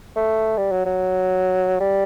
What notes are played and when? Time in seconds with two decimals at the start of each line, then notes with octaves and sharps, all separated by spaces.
0.16 A3
0.57 G3
0.71 F#3
0.86 F#3
1.80 G3